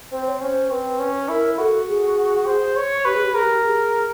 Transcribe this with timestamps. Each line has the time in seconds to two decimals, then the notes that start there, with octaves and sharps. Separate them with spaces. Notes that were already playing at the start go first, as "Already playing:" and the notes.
0.12 C4 C5
0.27 C#5
0.42 C#4 C5
0.70 C4 B4
0.99 C#4
1.29 E4 A#4
1.58 F#4 A4
1.88 G#4
2.47 C5
2.77 C#5
3.05 G4 B4
3.15 G#4
3.24 G4
3.32 G#4 A#4
3.42 G4
3.64 G#4